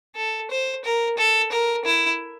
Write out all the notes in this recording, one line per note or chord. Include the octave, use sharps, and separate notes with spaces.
A4
C5
A#4
A4
A#4
E4